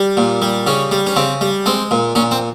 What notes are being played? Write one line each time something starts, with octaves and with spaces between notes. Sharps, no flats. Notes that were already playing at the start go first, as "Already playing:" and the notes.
Already playing: G3
A#2
G3
C#3 C#4
G3
C#4
C#3 C4
G3
G#3 C4
A#2
A#2 C#4
C4